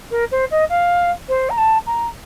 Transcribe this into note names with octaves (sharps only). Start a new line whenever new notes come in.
A#4
C5
D#5
F5
C5
A#5
A5
A#5